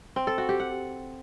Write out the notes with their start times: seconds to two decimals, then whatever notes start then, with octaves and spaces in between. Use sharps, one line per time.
0.16 C4
0.27 A4
0.38 F#4
0.49 G4
0.60 F#5